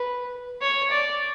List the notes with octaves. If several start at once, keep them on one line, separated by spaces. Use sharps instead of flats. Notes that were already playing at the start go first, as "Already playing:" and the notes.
Already playing: B4
C#5
D5